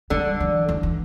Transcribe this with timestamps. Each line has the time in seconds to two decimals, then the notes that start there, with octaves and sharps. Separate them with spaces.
0.10 D3 G3
0.40 E3
0.69 E3
0.83 E3